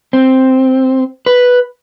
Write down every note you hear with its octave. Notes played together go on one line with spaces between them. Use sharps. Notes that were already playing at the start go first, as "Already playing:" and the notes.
C4
B4